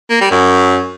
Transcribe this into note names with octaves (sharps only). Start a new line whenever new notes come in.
A#3
G3
F#2